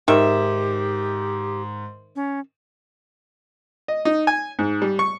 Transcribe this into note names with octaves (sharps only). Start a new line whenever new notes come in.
G#2 D#3 G4 E5
C#4
D#5
D#4
G#5
G#2
G3
C#6